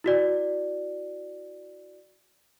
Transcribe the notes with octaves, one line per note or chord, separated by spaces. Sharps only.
E4 F#4 D5